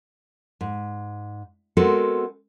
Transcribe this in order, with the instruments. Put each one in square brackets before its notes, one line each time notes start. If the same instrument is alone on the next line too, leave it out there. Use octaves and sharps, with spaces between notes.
[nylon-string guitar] G#2
G#3 B3 C4 F#4 A4 A#4